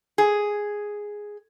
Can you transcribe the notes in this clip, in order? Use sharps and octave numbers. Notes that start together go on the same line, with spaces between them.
G#4